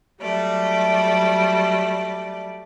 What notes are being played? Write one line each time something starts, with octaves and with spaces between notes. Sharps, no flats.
F#3 G3 A3 D5